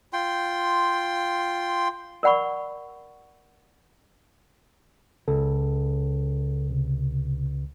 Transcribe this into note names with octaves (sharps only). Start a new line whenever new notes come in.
F4 G5 C6
A#4 D5 F#5 B5 C#6
C#2 A4
C3